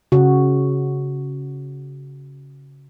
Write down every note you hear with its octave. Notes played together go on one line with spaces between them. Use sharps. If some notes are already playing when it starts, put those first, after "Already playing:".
C#3 F#4